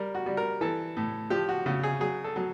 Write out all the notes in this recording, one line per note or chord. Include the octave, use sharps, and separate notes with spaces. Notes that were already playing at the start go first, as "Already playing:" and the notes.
Already playing: G3 A#4
F#4
G3
A#4
E3 A4
A2
F3 G4
F#4
C#3
G#4
F#3 G#4
A4
F#3